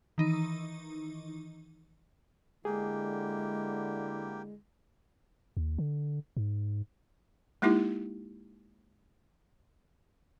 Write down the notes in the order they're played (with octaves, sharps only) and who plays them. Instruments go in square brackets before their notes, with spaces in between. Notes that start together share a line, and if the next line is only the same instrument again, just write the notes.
[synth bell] D#3 E3 D#4
[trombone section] D3 E4 [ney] G#3 [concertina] A#3 G4 [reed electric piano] G#4
[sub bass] D#2
D3
G#2
[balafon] G#3 A#3 D#4 E4 G4